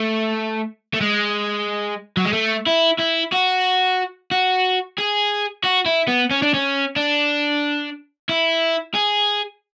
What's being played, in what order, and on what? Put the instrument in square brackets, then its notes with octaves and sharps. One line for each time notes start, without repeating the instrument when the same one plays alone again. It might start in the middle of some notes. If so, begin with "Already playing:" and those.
Already playing: [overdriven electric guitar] A3
A3
G#3
F#3
G#3
A3
E4
E4
F#4
F#4
G#4
F#4
E4
B3
C#4
D4
C#4
D4
E4
G#4